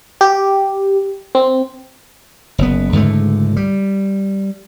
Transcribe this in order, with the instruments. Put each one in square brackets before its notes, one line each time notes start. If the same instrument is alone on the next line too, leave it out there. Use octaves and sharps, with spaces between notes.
[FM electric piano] G4
C4
[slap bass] F#1 B3
C#2 G#2 D3 A3
G3